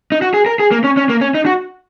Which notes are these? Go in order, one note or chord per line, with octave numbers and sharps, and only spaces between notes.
D#4
F#4
G#4
A#4
G#4
A#3
C#4
C#4
A#3
C#4
D#4
F#4